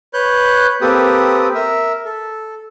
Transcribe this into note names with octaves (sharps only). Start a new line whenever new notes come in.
B4 C#5 F#6 G6
A#3 C4 G4 A4 B4 D#6
A#4 E5
A4